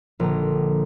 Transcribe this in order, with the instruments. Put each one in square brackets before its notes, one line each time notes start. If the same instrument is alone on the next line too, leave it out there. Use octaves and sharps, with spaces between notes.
[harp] A#1 D3 A#5